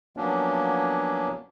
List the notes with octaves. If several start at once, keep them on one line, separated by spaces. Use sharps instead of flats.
F3 F#3 A#3 B3 C#4 D4